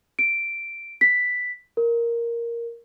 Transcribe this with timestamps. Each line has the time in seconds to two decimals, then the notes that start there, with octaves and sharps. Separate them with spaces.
0.19 D7
1.01 B6
1.77 A#4